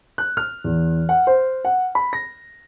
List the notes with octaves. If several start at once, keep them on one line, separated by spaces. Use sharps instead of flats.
F#6
F6
E2
F#5
C5
F#5
B5
A#6